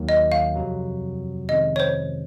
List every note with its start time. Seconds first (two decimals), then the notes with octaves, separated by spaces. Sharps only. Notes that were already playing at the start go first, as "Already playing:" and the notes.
Already playing: D#2 D#3 F#3 A#3
0.09 D#5
0.32 F5
0.56 F2 C3 F#3
1.49 F2 C3 D#3 G#3 C#4 D#5
1.76 C#5
1.80 C5